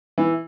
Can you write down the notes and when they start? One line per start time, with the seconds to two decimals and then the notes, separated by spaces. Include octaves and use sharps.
0.18 E3